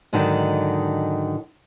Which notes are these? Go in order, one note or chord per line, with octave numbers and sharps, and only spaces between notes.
G#2 D3 D#3 F#3 D#4